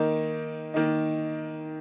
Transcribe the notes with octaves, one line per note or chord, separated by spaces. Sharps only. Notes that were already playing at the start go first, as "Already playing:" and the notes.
Already playing: D#3 A#3 D#4
D#3 A#3 D#4